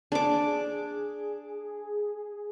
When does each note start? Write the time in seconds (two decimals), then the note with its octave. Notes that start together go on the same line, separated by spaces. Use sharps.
0.12 D4 G#4 D6